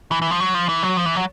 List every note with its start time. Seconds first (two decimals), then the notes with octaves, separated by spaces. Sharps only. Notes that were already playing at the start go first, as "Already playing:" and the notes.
0.11 E3
0.22 E3
0.31 F3
0.40 F#3
0.54 F3
0.69 E3
0.83 F#3
0.97 F3
1.06 E3
1.16 F#3